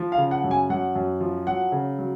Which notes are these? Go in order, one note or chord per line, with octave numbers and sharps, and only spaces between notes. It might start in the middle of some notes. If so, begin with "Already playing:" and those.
Already playing: F3
F5
C#3
F#5
F#2
G#5
F#2 F#5
F#2
F3
F#3 F#5
C#3
F#3